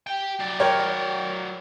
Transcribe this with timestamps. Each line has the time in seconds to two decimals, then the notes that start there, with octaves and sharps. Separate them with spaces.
0.07 G4 G5
0.39 F#3 D5
0.60 A#4 C#5 G5